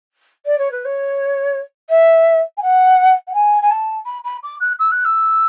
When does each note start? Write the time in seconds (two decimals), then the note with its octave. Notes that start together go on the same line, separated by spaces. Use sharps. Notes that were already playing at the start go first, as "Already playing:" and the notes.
0.46 D5
0.58 C#5
0.71 B4
0.85 C#5
1.89 E5
2.57 G#5
2.62 F#5
3.27 F#5
3.34 G#5
3.62 G#5
3.70 A5
4.06 B5
4.24 B5
4.43 D6
4.60 F#6
4.79 E6
4.91 F#6
5.05 E6